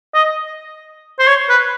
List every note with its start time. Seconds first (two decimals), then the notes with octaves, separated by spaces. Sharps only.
0.14 D#5
1.19 C5
1.27 C#5
1.49 B4